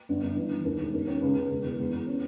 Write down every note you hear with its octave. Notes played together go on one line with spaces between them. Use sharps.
G1
G1
E3
E3
D#2
E1
D#2
C#4
C#2
C#2
E1
E2
E2
E2
C#4